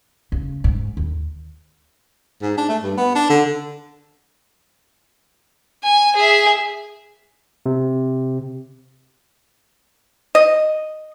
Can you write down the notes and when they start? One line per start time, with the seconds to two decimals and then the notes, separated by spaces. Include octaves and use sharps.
0.32 C#3
0.64 G#2
0.97 D#2
2.42 G#2
2.57 D4
2.69 A3
2.83 G2
2.97 B3
3.15 D4
3.30 D3
5.83 G#5
6.16 G#4 E5
7.66 C3
10.35 D#5